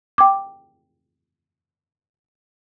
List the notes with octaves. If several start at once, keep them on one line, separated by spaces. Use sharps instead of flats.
G5 D6